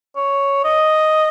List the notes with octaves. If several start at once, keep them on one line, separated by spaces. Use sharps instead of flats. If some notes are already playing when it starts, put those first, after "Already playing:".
C#5
D#5